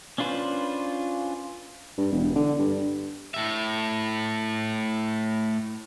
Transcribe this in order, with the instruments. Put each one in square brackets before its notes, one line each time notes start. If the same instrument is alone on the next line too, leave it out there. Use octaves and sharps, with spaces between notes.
[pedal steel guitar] C#4 D4 F4 B4 C5
[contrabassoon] G2
E1
D3
G2
[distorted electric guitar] A2 E5